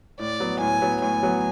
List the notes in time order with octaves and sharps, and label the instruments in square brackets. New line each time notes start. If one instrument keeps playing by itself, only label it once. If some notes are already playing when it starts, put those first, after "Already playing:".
[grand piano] A2 [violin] D5
[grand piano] F#3 B3
[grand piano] A2 [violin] G#5
[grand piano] F#3 B3
[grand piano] A2 [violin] G#5
[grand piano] F#3 B3